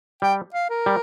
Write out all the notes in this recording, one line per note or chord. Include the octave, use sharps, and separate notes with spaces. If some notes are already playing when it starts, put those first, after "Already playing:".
G3 G5
F5
A#4
G3